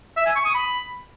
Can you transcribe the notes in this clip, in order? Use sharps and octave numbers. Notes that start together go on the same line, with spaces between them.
E5
G#5
C#6
D#6
B5